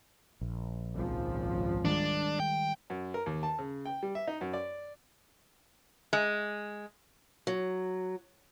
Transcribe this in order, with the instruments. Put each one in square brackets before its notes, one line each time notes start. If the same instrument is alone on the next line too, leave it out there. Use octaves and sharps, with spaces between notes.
[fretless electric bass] A#1
[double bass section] G#1 C#2 F3
[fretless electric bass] D#3 G3 G#3 [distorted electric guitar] D4
[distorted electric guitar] G5
[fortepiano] F#2
A#4
D#2
A5
C#3
G5
G3
E5
D#4
F#2
D5
[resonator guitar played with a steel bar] G#3
[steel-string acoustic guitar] F#3